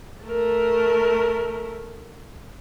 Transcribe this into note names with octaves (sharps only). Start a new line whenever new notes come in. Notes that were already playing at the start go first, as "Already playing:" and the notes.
A3 A#4